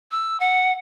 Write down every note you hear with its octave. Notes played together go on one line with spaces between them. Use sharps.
E6
F#5